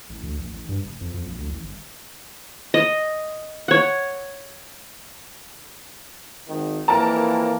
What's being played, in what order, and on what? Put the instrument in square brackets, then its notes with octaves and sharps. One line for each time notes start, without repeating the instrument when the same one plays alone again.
[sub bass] A1
D2
A#1
A1
G2
F1
F2
F2
A#1
D2
A1
G1
[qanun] D#5
C#5 F#5
[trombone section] G#1 D#3
[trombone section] F2 E3 A#3 [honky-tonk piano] A#4 A5